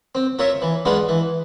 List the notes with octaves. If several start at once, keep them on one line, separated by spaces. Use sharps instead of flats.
C4
F4 A#4 C#5 E5
E3
G#3 B3 D4 F4
E3